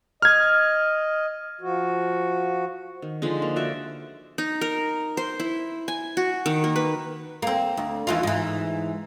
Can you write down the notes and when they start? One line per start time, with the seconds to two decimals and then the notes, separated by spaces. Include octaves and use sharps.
0.22 D#5 F6 G#6
1.61 F3 F#4
3.02 D#3
3.22 D3 F3 G#3 D#4
3.42 A#3
3.56 F#4 C5 D5 E5
4.38 D#4
4.61 A#4
5.17 C5
5.40 E4
5.88 G#5
6.17 F#4
6.46 D#3
6.64 A#3
6.76 B4
7.42 A#3 C4
7.77 D2
8.07 D#2 E3 F4
8.23 G#2 E3